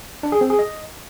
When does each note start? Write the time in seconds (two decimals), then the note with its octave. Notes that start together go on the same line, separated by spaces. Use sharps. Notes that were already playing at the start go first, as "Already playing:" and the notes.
0.23 D4
0.32 G#4
0.41 C4
0.50 G#4
0.59 D#5